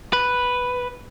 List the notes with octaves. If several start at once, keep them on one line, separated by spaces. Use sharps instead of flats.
B4